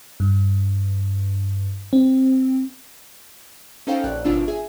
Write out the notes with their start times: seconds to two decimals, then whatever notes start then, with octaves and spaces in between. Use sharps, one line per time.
0.20 G2
1.93 C4
3.87 C#4 D#4 A4 C5 F5 G5
4.04 A#1 C#5 D5 F#6
4.24 G#1 B2 D4 F4 E6
4.48 G#4 E5 G#5